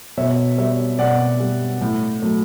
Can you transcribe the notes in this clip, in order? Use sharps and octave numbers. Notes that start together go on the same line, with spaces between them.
B2 C#5 E5
G3 C#5 E5
B2 D5 F#5
G3
A2
F#3 A3